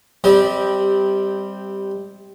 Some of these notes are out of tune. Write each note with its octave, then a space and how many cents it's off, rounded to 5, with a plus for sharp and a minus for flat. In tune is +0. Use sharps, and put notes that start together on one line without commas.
G3 +0 C4 -5 D#5 +40